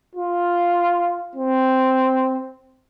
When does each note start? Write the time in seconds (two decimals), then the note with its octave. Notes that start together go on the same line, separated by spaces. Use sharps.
0.15 F4
1.35 C4